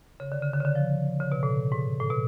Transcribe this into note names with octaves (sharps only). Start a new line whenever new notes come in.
C#3
D3
C#3
D3
C#3
D3
F3
C#3
B2
A2
G#2
A2
B2